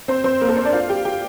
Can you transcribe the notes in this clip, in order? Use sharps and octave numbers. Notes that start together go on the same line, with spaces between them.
C4 C5
C4 C5
A#3 A#4
A4
C4 C5
D4 D5
F4 F5
G4 G5
G4 G5